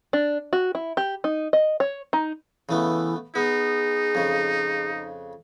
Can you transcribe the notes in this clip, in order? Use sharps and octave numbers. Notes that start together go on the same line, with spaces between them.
D4
F#4
E4
G4
D#4
D#5
C#5
D#4
C#3 E3 A3 B3
B3 D#4 G#4
F2 C#3